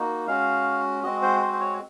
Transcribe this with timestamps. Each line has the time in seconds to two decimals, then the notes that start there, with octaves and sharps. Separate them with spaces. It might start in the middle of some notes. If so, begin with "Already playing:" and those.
Already playing: A#3 D#4 F#4
0.27 G#3 C#4 F#4 F5
1.03 G#3 C4 F#4 D#5
1.22 C5
1.41 C5
1.53 C5
1.61 C#5